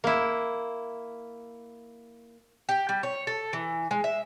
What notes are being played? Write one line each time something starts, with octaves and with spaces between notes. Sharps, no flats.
A#3 E4
G4
G3
C#5
A4
E3
G#3
E5